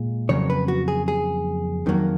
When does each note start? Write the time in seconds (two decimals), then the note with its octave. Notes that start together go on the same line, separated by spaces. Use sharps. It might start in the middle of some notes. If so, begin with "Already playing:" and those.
Already playing: A#2 G#3
0.29 F2 C#3 F#3 A#3 C#5
0.50 B4
0.68 F#4
0.88 G#4
1.08 G#4
1.86 F2 D#3 F#3 A#3